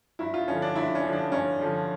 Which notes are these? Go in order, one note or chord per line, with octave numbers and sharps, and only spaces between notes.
G2 E4
F4
D3 F3 C#4
D4
G2 E4
C#4
D3 F3
D4
G2 C#4
D3 F3